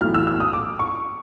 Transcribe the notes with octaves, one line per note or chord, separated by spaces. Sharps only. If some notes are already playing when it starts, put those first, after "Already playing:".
B1 A2 E3 F6
E6
E6
D#6
D6
C#6